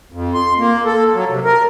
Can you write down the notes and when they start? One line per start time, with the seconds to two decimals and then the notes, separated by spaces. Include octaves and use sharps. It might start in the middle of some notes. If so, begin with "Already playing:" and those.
0.12 F2
0.34 C6
0.58 A#3
0.85 A4
1.13 F#3
1.29 C3
1.45 A#4